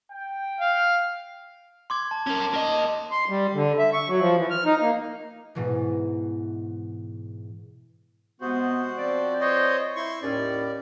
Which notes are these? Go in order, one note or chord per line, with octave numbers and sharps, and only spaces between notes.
G5
F5
C6 D6 G#6
A5
C#4 A#4
A#3 D#5
C6
G3
D3
E5
C#6
F#3
F3
E3
F6
D#4
A#3
G#2 B2 E3
C3 G#3 B3 F#4 C5
F3 C4 D5
C5 C#5 D#5
E4 C6 C#6
D#2 A2 C#4 D5